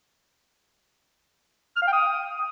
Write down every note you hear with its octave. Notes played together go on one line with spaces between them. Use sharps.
F6
F5
G5
D#6